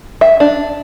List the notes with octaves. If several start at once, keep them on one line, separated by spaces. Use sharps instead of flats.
E5
D4